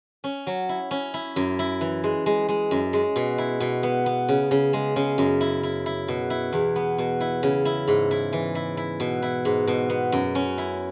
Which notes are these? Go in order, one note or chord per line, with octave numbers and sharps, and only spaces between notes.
C#4
F#3
E4
C#4
E4
F#2
E4
E3
G#3
G#3
G#3
F#2
G#3
B2
E4
B2
B3
B3
C#3
C#3
G#3
C#3
F#2
E4
E4
E4
B2
E4
E2
B3
B2
E4
C#3
E4
G#2
E4
E3
E4
E4
B2
E4
G#2
B2
B3
F#2
C#4
E4